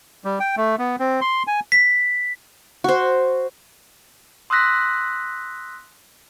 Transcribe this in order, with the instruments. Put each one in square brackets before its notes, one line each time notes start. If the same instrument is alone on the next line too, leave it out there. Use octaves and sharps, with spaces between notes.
[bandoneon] G3
G5
A3
B3
C4
C6
G#5
[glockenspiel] B6
[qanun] F#4 C5
[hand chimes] C6 D#6 E6 F#6 A#6 B6